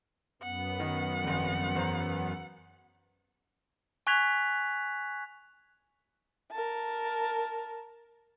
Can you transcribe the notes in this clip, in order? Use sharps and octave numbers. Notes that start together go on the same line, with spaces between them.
F#2 B3 F#5
D#3
G#1 F2
E2 C5 A#5
G#5 C#6 F#6 G#6 B6 F7
A#4 A5